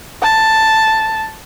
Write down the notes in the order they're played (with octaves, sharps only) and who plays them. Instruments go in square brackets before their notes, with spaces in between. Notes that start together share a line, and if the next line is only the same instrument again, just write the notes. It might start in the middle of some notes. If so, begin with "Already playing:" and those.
[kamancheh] A5